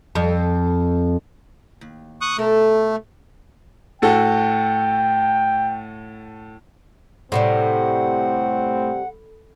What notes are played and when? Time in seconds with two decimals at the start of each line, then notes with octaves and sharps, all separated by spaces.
0.15 F2
1.81 D#2
2.21 C#6 D#6 F#6
2.38 B2 A3 A4 A#4
4.02 A2 F#4 A4 G5
7.32 A2 C3 D#3 G3 C4 F#5